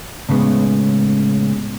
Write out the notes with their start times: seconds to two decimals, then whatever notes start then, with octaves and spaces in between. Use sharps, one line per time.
0.29 A2 C#3 G#3 B3